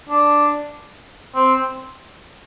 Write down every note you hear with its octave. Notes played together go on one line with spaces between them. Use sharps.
D4
C4